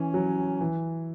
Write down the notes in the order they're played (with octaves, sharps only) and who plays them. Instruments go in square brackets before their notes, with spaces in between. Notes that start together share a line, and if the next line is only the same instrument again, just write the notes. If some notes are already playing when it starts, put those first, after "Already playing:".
Already playing: [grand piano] E3 [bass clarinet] C#4
[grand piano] F#3
E3